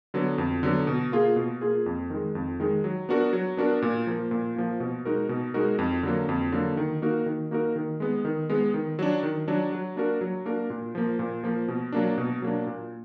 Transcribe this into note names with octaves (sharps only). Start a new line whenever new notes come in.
D3 F#3 B3
F2
D3 F#3 B3
B2
A#3 F4 G#4
B2
A#3 F4 G#4
F2
D#3 G#3
F2
D#3 G#3
F#3
B3 D4 F#4 A#4
F#3
B3 D4 F#4 A#4
A#2
F3 A#3
A#2
F3 A#3
B2
G#3 D#4 F#4 A#4
B2
G#3 D#4 F#4 A#4
F2
D3 F#3 A#3
F2
D3 F#3 A#3
D#3
A#3 D#4 F#4 A#4
D#3
A#3 D#4 F#4 A#4
D#3
G#3 B3
D#3
G#3 B3
D#3
F#3 D4
D#3
F#3 D4
F#3
A#3 D4 F#4 A#4
F#3
A#3 D4 F#4 A#4
A#2
F3 A#3
A#2
F3 A#3
B2
F#3 A#3 D4
B2
F#3 A#3 D4
A#2